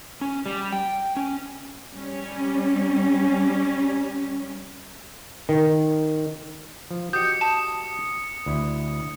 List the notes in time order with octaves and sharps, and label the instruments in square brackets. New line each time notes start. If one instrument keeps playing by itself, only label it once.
[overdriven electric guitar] C#4
G3
G5
C#4
[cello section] G3 C#4
[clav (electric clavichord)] D#3
F3
[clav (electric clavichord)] F#4 G4 D#5 [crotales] D#6 C#7 [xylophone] G6
[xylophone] A5
[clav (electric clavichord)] D2 E4